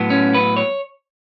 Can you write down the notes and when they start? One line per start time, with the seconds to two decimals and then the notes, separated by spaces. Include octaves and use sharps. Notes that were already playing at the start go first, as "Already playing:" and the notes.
Already playing: A2 F#3 B3
0.10 C#4
0.34 B4
0.57 C#5